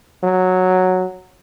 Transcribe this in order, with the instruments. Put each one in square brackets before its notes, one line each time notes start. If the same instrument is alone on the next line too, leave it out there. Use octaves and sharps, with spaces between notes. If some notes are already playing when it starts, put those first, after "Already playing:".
[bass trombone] F#3